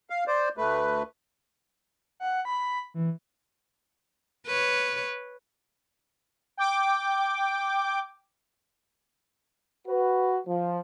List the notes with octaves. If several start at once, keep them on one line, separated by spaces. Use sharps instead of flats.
F5
C5 D5
D2 A3 B4
F#5
B5
E3
B4 C#5
G5 D6
F#4 B4
F3